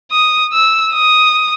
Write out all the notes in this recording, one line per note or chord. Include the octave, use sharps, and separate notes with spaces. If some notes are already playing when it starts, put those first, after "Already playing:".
D#6
E6
D#6